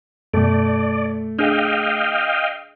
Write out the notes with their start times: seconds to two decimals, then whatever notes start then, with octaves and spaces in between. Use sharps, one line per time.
0.34 F#2 B2 A3 D5
1.39 D4 G#4 D#5 F5 G5